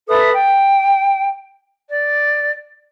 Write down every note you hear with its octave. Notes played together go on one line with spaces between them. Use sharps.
A4 B4 E5 D#6
G5
D5